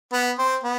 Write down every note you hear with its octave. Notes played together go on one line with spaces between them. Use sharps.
B3 B4
C4 C5
B3